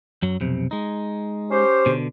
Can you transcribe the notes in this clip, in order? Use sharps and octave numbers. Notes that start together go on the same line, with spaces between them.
F#2 F#3
B1 F2 C3
G#3 D#4
C#4 G4 C5
B2 D3